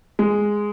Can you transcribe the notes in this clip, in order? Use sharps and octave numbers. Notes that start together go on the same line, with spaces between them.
G#3